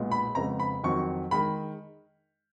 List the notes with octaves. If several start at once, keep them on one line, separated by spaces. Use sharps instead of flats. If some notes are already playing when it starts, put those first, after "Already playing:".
Already playing: B1 A#2 G#3 B3
B5
F2 C#3 G#3 B3 A#5
B5
F2 D#3 F#3 C#6
D#3 G#3 B5